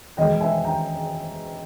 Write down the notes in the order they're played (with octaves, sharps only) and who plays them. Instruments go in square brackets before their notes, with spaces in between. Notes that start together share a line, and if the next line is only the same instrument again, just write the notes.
[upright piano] E2 B2 G#3 D#5 G5
E5 G#5
G5 A#5